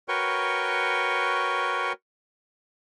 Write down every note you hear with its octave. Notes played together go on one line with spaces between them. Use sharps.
F#4 A#4 B4 C#5 G5 C#6